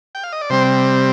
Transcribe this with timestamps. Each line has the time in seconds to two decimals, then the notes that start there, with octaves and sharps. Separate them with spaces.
0.15 G5
0.24 F5
0.32 D#5
0.41 D5
0.50 C3 G3 C4 C5